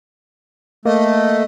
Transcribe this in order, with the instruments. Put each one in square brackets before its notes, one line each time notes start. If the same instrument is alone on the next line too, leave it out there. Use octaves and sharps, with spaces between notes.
[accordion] A3 [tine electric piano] A#3 [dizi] D#5